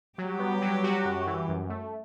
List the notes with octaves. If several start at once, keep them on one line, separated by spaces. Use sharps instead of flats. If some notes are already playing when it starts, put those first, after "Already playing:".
F#3 G3 G4
B3
F#3
F#4
F#2
E3
F#2
A3